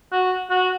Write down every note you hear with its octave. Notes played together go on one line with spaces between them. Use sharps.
F#4
F#4